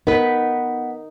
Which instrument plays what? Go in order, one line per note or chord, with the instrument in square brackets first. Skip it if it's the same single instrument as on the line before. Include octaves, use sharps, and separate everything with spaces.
[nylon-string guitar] B3 B4 [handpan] D#4 [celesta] A#4